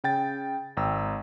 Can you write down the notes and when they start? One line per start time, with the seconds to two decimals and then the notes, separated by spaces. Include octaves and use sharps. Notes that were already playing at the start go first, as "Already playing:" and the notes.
0.04 C#3 G5 A6
0.77 G#1 G5 A#5 E6